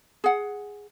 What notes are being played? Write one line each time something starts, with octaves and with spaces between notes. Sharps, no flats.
G#4 F#5